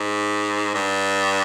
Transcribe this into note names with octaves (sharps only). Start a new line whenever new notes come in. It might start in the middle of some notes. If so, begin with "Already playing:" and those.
Already playing: G#2
G2